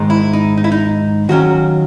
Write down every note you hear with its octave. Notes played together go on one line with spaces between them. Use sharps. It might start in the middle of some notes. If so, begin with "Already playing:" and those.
Already playing: G#2 D#3 G#3 D#4
E4
D#4
D#4
E4
D#4
D#2 D#3 F#3 C#4 F#4